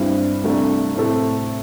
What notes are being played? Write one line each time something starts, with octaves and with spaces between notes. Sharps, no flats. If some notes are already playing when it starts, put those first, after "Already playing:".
Already playing: G2 G3 C4 E4 C5
C2 C3 A3 D4
A2 A3 C4 A4